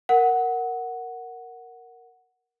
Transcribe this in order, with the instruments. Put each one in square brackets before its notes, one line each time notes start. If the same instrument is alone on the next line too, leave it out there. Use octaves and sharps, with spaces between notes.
[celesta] A#4 F#5